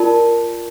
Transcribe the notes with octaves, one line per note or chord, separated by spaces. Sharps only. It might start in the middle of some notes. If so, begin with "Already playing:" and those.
Already playing: F4 A#4 D5 A5